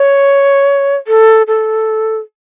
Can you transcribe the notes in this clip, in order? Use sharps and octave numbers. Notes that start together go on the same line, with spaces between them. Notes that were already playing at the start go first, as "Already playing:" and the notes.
Already playing: C#5
A4
A4